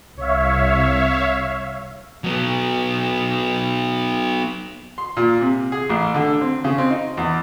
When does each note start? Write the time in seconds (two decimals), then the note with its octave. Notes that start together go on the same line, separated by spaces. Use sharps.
0.17 C2 C#5 E5 F5
2.24 F#3 B3
4.98 C6
5.17 A#2
5.41 C3
5.72 G#4
5.90 A1
6.14 D3
6.41 C4
6.64 C#3
6.78 C4
6.90 D#4
7.17 E2